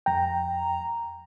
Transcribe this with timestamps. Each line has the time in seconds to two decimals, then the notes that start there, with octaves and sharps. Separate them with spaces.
0.06 F2 G5 A#5